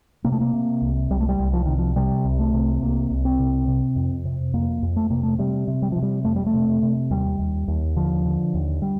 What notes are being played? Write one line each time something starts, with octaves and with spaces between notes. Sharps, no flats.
C3 A#3
A3
A#3
C3
C2
C2 G3
A3
G3
C2
F3
C3 D#3
F3
C3 G3
C2
A3
C3
C2 A#3
C2
C4
C3
C3
F2
C3
F2 A#3
F2
A3
C3 A#3
A3
C3 G3
C3
G3
C3 F3
G3
F2 A3
G3
A3
C3
C3
D#2 G3
D#2
D#2
D3 F3
D3
D#2
G3